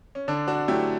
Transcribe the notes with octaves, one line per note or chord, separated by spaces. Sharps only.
C#4
D3 D4
D4 F#4
F#3 A3 E4 G4